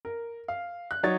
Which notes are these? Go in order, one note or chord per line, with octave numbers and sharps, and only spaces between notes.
A#4
F5
F#6
F#3 D#4 C#5 A6